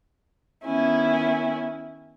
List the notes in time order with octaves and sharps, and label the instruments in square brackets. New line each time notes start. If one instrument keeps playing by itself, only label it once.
[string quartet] D#3 B3 C#4 E4 G#5